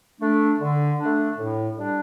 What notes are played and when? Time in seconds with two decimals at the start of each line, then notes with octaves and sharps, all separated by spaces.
0.20 A3 D4
0.60 D3
0.99 A3 D4
1.37 A2
1.77 G3 D4